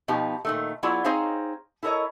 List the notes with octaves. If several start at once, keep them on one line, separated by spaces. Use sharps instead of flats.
B2 F3 B3 D#4 G4
A#2 D#3 A3
F#3 B3 E4 F4 G#4 D5
C4 D#4 G#4 C5 C#5 F5
E4 A4 A#4 C#5 D#5